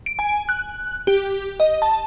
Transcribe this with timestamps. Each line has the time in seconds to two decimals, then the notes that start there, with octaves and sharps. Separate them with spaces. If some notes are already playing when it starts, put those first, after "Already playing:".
0.06 D7
0.19 G#5
0.49 F#6
1.07 G4
1.60 D#5
1.82 A5